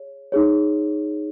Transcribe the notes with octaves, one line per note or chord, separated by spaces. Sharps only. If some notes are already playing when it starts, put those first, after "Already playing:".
Already playing: G#4 C#5
D#4 G#4 C#5